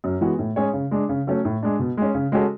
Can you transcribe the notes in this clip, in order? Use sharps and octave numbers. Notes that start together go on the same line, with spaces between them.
F#2
E3 G#3 B3 F#4
A2
G#3 C#4 G#4 C#5
C#3
G#3 D4
C#3
F#3 A3 C#4
A2
G#3 D4
B2
G#3 C#4
C#3
G#3 C#4 F#4 A4